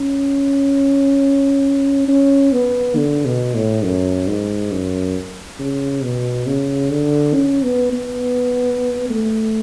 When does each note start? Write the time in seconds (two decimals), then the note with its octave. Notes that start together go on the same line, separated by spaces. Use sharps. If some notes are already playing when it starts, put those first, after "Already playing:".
Already playing: C#4
2.08 C#4
2.52 B3
2.97 D3
3.26 B2
3.55 A2
3.84 F#2
4.28 G#2
4.72 F#2
5.59 C#3
6.03 B2
6.47 C#3
6.91 D3
7.34 C#4
7.64 B3
7.93 B3
9.10 A3